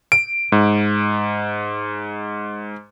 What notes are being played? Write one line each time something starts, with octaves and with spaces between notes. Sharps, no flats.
D7
G#2